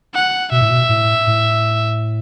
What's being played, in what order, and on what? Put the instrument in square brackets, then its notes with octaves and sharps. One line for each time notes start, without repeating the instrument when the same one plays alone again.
[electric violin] F#5
[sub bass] B2 [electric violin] E5
[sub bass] A2
B2
A2
A2